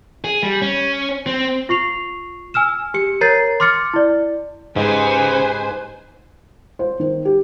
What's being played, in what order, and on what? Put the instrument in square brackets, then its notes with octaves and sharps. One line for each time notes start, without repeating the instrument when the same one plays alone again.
[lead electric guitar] G#4
G3
C#4
C4
[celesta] F4 C#6 C7 F7
G#5 E6 F6 E7
G4 C#7
A#4 C#5 A#5 G6 A6 C7
C6 D6 F6 A6 C#7
E4 D5
[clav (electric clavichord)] G#2 [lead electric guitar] C#3 [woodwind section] D#4 G4 B4 [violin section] C5 G#5
[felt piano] C5
D#3
G4